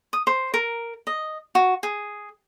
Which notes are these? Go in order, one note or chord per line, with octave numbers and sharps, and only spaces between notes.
D#6
C5
A#4
D#5
F#4
G#4